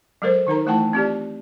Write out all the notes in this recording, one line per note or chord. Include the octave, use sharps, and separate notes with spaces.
F#3 G#3 A4 A#4 C5
D#3 D#4 A#4 A#5
E3 A3 E4 F#5 G5 A5
C4 F4 G4 D5